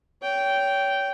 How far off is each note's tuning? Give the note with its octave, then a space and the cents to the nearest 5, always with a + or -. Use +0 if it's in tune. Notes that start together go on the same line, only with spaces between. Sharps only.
C#5 +30 G5 -10